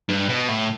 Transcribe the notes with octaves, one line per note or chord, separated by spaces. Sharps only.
G2
B2
A2